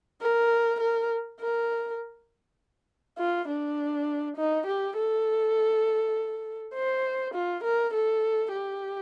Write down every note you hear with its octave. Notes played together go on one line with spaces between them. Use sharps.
A#4
A#4
A#4
F4
D4
D#4
G4
A4
C5
F4
A#4
A4
G4